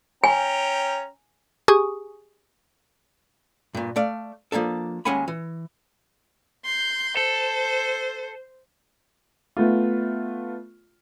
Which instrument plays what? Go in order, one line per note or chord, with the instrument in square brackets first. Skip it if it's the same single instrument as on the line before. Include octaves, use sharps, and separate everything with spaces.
[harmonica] C#4 G5 A#5 [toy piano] G#5
[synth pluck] G4 G#4 G#5 C#6 D#6
[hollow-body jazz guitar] G2 A#2
A3 D5 F5
F3 A#3 D4 A4
D#2 G#3 C#4 F#5 G#5 B5
E3
[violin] C6 G6
[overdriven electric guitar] A4 [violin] C5
[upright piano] A3 B3 F4